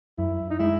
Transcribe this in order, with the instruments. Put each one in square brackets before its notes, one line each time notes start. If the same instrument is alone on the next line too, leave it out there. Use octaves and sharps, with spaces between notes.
[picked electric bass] F#2 [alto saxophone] E4
[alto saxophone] D#4
[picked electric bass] G#3 [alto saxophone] E4